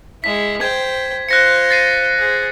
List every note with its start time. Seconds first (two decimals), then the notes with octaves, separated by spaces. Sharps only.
0.24 G#3 E4 B6
0.61 C5 G5 G#6
1.29 F4 C5 F#6 A#6 C#7
1.71 A6 C7 D#7
2.18 G#4 C5